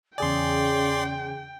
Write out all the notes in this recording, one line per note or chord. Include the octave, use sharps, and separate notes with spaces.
E2 C#3 G#4 D5 G5 G#5 C6